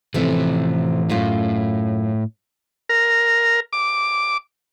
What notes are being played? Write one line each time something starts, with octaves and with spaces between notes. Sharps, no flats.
A2 C3 E3 F3 A4
F#2 A2 C#4 F4
A#4
D6